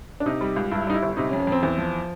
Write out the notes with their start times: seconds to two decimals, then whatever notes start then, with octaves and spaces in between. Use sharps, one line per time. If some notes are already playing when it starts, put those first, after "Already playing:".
0.20 D4
0.26 C3 D#4
0.41 G3
0.56 C#2
0.71 G2 E4
0.87 G3 D#4
0.94 E4
1.03 G1
1.17 C3 D#4
1.29 C#4
1.33 F2
1.40 C#4
1.47 F2 C4
1.63 E2 C4
1.78 F3